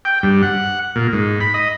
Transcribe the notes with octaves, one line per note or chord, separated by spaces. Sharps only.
G5
G2
F#5
A#2
G#2
B5
D#5